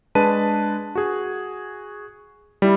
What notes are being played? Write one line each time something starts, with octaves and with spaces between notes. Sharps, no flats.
G#3 D4 B4 A5 D#7
F#4 G#4
G3 E4